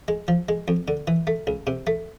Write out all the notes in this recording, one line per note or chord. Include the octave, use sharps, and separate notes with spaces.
G#3
F3
G#3
F2
D3
E3
A3
C#2
C3
A3